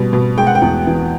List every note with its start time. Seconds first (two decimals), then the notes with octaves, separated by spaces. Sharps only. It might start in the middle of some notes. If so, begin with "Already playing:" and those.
Already playing: B2 G3 B3
0.13 B2
0.38 G#3 G5
0.47 F#5
0.55 G5
0.62 E2
0.87 E3